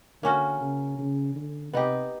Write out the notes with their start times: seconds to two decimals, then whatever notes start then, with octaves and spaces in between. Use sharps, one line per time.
0.22 D3 A#3 C#4 F#4
0.60 C#3
0.98 C#3
1.35 D3
1.73 C3 B3 D#4 G4